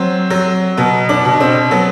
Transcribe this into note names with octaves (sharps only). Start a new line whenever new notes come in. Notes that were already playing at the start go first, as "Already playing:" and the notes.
Already playing: F#3 C4
F#3
B2 B3
D4
B2
C4
F#3 B3